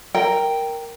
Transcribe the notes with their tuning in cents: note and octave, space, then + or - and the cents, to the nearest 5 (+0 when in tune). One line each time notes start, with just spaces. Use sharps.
A#4 +0 G5 +0